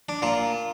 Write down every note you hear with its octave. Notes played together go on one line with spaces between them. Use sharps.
D4
A#2 F4